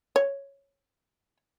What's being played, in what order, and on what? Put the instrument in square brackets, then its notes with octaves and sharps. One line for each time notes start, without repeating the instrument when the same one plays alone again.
[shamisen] C#5